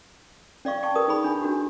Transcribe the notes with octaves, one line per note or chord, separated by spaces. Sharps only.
C#4 D5 F5 C#6
D5 G5 A5 C#6
G4 A#4 B4 D#6
D#4 G#4 B5
D4 G#5
D4 F#4 G4